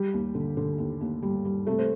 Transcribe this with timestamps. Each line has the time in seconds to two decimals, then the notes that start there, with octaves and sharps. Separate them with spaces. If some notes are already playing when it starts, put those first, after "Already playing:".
Already playing: G3 G4
0.13 D#2
0.35 D3
0.57 D3
0.78 D#2
1.01 D#2
1.23 G3
1.45 G3
1.67 C3 A3 A4
1.79 C5